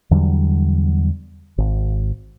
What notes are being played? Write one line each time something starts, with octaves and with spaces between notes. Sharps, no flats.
E2 D3 F#3 G3
G#1